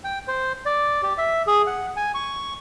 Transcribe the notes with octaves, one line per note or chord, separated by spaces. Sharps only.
G5
C5
D5
G4
E5
G#4
F#5
G#5
C#6